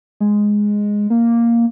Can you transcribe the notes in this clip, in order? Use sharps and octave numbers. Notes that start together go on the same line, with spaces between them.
G#3
A#3